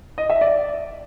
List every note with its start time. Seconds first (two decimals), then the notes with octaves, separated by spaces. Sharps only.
0.18 D#5
0.30 E5
0.41 D5